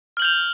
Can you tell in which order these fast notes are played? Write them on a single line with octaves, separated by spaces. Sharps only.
F6 F#7 G6 F7